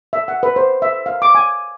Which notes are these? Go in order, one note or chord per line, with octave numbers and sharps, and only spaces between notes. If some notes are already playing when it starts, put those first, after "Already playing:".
E5
F#5
B4
C5
E5
F5
D6
G#5